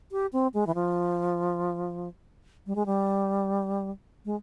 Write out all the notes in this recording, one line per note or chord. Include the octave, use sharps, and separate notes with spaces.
G4
C4
G#3
E3
F3
G3
G#3
G3
G#3